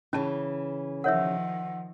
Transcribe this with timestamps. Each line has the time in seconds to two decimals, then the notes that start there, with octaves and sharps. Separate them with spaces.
0.13 C#3 E3 C#4 A5
1.04 D#3 F3 A#4 C#5 E5 F#5 E6